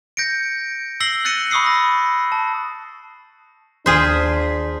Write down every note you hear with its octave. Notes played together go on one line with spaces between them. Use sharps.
G6 A#6 C#7 D7
E6 A#6 C7 F#7 G7
F#6 A6 A#6 C#7 D#7
B5 C#6 D#6 E6 C7
A#6
A5
D#2 D4 F4 G#4 C5 B6